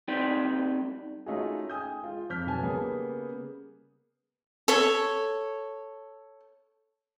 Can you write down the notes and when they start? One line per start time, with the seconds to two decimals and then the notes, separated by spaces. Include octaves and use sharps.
0.08 G3 C4 D#4 G4 D5 G5
1.26 A3 C#4 D#4 F4 F#4 G#4
1.70 G5 G#5 D#6 G6
2.03 G#3 F4
2.30 F2 F6 G6 B6
2.47 B1 B4 G#5 A5
2.63 C#3 G3 A#3 B3 G#4
4.68 A4 C#5